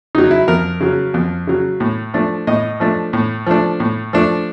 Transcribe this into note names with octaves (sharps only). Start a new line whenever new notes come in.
C#3 F#3 D#4
E4
F2 A#4
C#3 F#3
F2
C#3 F#3
A2
F3 A3 D4
A2 D#5
F3 A3 D4
A2
F3 A3 D4
A2
F3 A3 D4